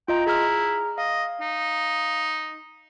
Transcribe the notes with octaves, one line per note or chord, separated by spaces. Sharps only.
F4 D#5 G5 A#5
E4 G#4 A#5 F6
D#5 F5
D#4